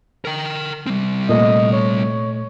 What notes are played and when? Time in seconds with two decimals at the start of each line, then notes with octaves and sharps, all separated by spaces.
0.25 A#4 G5
0.86 G3 C4
1.29 A#2 A3 D#5
1.73 C#5